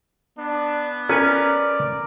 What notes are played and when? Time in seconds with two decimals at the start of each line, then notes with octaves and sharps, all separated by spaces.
0.38 B3 D4
1.09 C#4 A#4 B4 D5 G#5